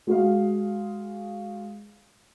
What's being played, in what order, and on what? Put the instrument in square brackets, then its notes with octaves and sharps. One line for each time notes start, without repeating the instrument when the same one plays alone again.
[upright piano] G#3 F#4 G#4 F5